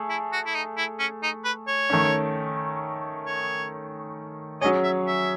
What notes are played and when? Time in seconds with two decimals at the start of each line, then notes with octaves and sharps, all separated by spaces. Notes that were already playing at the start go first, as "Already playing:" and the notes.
Already playing: A3 G#4
0.09 E4
0.33 F#4
0.46 E4
0.55 D#4
0.77 E4
0.99 C#4
1.23 D#4
1.44 B4
1.67 C#5
1.90 D#3 A3 C#4
3.26 C#5
4.61 F#3 C#4 G#4 C#5 D#5
4.83 E5
5.07 E5